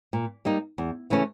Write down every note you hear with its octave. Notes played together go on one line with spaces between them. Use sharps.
A#2
G3 A#3 D#4
E2
C#3 E3 A3 C#4